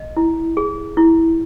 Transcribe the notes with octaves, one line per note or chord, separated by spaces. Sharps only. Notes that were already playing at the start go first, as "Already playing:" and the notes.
Already playing: D#5
E4
G#4
E4